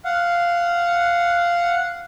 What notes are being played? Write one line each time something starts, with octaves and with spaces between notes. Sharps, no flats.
F5 F#5